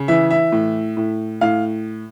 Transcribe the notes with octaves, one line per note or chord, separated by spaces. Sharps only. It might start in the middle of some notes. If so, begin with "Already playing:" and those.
Already playing: C#3
E3 E5
E5
A2
A2
A2 F5